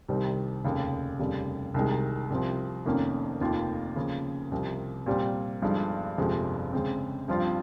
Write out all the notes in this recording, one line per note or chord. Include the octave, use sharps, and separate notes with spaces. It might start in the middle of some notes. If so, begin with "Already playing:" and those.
C2 C3 D#3 G3 C4
F1 D#2 C#3
F1 D#2 C#3 G3
C2 C3 D#3 G#3
C2 C3 F3
F1 F2 D#3 A#3 C#4
F1 D#2 D#3 A#3 F4
C#3 F3 A#3
C2 C3 F3
A#2 G3 C4
G1 G2 F3 G#3 D#4
G1 F2 C3 F3 G#3
C#3 G#3 C4
G2 F3 C4 F4 C5